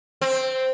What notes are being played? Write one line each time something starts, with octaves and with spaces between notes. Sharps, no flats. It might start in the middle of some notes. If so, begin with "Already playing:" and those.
C4